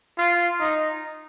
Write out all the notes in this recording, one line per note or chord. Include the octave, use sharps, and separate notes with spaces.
F4
D#4